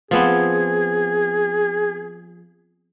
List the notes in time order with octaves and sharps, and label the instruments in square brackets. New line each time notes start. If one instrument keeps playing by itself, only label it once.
[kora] F3 B3 C4 [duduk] G#4